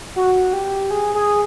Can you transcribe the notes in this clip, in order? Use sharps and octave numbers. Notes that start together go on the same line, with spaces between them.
F#4
G4
G#4
G#4